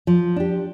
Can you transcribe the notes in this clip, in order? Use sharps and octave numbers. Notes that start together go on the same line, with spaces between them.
F3
D4 G4